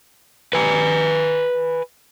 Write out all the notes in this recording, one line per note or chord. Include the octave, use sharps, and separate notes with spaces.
B4 G#5 A#5